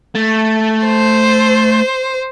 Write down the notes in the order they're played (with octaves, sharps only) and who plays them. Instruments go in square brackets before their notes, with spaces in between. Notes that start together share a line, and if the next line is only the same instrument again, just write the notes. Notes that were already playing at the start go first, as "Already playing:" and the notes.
[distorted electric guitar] A3
[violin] C5